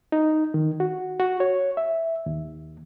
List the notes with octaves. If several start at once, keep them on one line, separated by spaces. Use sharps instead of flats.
D#4
D#3
F#4
F#4
C#5
E5
D#2